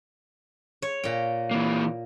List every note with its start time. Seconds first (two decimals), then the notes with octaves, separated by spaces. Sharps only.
0.82 C#5
1.04 A#2 G5
1.51 E3 A#3